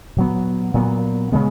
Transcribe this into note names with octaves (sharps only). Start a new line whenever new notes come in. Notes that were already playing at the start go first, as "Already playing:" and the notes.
A#2 F#3 B3
A#2 F#3 B3
C#3 G#3 B3